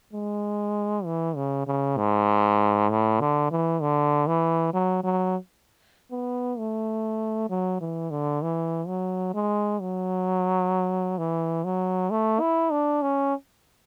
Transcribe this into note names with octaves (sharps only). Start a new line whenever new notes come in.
G#3
E3
C#3
C#3
G#2
A2
D3
E3
D3
E3
F#3
F#3
B3
A3
F#3
E3
D3
E3
F#3
G#3
F#3
E3
F#3
A3
E4
D4
C#4